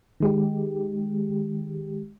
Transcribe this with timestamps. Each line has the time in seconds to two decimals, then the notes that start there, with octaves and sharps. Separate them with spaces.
0.20 D#3 G#3 G4